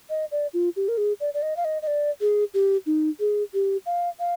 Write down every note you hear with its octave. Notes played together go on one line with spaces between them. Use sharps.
D#5
D5
F4
G4
A#4
G#4
D5
D5
D#5
F5
D#5
D#5
D5
G#4
G4
D#4
G#4
G4
F5
F5